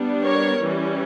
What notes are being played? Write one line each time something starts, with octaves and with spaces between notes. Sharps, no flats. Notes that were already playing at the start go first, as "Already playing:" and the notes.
Already playing: G3 B3 D4
A#4 C#5
E3 G3 C#4